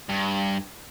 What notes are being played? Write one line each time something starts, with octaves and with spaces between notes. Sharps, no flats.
G2